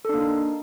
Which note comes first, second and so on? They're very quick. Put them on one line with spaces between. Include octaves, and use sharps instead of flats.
A4 D4 A#3 D#4